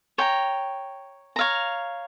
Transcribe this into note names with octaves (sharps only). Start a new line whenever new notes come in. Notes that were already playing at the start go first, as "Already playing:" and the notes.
C#5 G5 A#5
C#5 F5 A#5